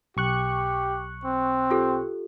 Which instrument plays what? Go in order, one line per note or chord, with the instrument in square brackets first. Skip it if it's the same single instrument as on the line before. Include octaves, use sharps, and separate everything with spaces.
[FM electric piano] B1 C#6 F#6 [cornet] G4
[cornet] C4
[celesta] F4 G4 A4